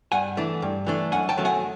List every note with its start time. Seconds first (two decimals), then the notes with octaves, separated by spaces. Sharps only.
0.12 G2 F#5 G#5
0.37 E3 A3 D4
0.62 G2
0.87 E3 A3 D4
1.12 F#2 F#5 G#5
1.29 G5 A5
1.37 D#3 F#3 A3 C#4
1.45 F#5 G#5